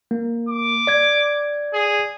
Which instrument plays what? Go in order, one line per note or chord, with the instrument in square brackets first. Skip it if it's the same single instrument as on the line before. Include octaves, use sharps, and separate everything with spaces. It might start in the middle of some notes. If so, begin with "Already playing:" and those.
[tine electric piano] A#3
[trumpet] D6
[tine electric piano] D5 G#6
[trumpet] G#4